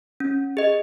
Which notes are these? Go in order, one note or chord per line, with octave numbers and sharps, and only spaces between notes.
C#4
G#4 D#5